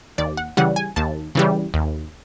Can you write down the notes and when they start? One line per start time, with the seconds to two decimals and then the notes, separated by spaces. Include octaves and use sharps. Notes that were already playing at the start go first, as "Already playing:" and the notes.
0.18 D#2 D5
0.37 F#5
0.57 C#3 E3 G3 F#5
0.76 G#5
0.96 D#2 A5
1.35 C#3 E3 G3
1.74 D#2